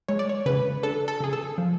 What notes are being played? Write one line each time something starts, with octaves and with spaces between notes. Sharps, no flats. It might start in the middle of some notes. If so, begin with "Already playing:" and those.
G#3 C#5
D5
C#5
C#3 B4
D4 A4
A4
C#3 G#4
A4
F3